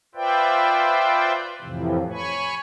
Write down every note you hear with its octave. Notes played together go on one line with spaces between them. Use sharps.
F4 B4 C5 D5 E5 G5
F2 A2 C3 E3 F3
C#5 G#5 B5 C#6